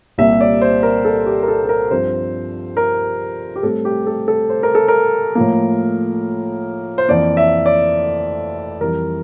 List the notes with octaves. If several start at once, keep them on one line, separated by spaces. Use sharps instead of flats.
C2 A#2 G3 A#3 E5
D5
C5
A#4
A4
G4
A#4
A4
A4
A#4
G2 F3 C4 C5
A#4
G4
A2 G3 C4 A4
G4
A4
A4
C5
A#4
A4
A#4
A2 F3 A#3
C5
F2 E3 A#3 D5
E5
D5
F2 E3 G3 A#4